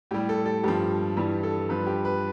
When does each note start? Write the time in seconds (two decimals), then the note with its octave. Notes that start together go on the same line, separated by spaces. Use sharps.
0.11 A2 G3 G4
0.29 A4
0.46 A4
0.63 G2 F3 G4
1.17 G2 E3 G3
1.43 A4
1.69 G2 F3 B4
1.87 G4
2.05 B4